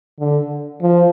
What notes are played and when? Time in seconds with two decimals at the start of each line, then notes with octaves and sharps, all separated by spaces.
0.19 D3
0.82 F3